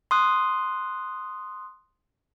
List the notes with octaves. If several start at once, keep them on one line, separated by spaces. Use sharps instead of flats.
C6 D#6 F#6